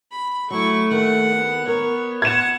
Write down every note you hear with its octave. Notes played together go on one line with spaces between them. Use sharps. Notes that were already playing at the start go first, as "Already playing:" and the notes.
B5
F#3 A3 E4 C#6
D#2 D#3 F#5
B3
A#4 C#5
F#5 G#6 E7